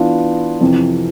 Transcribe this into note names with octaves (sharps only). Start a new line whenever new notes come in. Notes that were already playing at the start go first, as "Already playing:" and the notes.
Already playing: E3 B3 D4 F4
F2 C3 E3